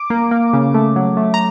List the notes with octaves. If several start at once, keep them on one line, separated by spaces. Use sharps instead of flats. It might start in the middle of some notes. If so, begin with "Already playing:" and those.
Already playing: D6
A#3
A#3
C#3
A3
F#3
A3
A#5